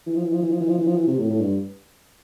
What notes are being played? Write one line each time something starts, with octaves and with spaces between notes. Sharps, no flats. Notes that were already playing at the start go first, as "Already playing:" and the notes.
E3
F3
E3
F3
E3
F3
E3
F3
E3
F3
E3
C3
A2
A2
G2